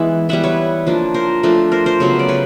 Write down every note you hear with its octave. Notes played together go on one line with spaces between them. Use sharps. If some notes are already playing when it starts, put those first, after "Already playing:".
Already playing: E3 G#3 B3 E4 E5 F#5
G3 B3 E4 E5 F#5
B4 C#5
F3 A#3 D4
A#4 C5
F3 A3 D4
A#4 C5
A#4 C5
C#3 F#3 B3
D5
B4 C#5